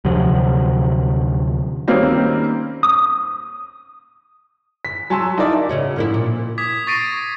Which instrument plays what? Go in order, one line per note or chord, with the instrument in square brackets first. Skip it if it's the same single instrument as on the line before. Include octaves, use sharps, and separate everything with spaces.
[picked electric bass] D2 C3 F3 F#3
[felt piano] D#3 G3 A#3 C4 C#4 D#4
[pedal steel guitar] D#6
[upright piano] B6
F#3 G#5 A5 C6 E6
D#4 E4 A#4 D5 E5
[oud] C#3 C#4 F#4
F3 A#3 E4
A#2
[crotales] D6 D#6 G#6 B6
C#6 A6 A#6 C7 D7 D#7